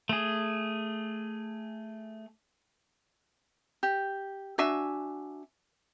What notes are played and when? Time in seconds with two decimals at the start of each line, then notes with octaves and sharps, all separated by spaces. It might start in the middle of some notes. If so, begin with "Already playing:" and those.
0.09 A3 G#4
3.83 G4
4.58 D4 F#4 E5 G#5